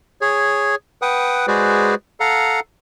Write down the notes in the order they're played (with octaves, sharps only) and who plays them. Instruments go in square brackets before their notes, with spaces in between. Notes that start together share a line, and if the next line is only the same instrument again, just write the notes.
[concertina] G#4 C#5
B4 F#5 G5 D#6
G#3 F#4 G#4 B4 C5 D5
A4 F5 F#5 A#5